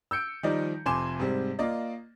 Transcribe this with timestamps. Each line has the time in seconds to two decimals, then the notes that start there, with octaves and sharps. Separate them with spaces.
0.11 E6 G6 C#7 D7
0.43 D#3 F3 G3 D#4 D5
0.86 F1 F2 G#5 C6 D6 E7
1.20 G#2 C3 G3 C4
1.59 A#3 F4 D5 D#5